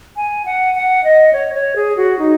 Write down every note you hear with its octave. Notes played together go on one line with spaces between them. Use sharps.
G#5
F#5
F#5
D#5
C#5
C#5
G#4
F#4
D#4